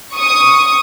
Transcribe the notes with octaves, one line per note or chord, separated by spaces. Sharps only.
C#6 D#6